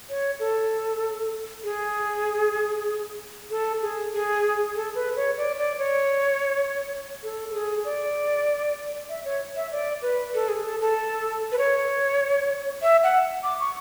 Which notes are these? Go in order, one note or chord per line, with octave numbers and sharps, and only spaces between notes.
C#5
A4
G#4
A4
G#4
G#4
A4
B4
C#5
D5
D5
C#5
A4
A4
G#4
D5
E5
C#5
E5
D5
B4
A4
G#4
A4
A4
B4
C#5
E5
F#5
D6
C#6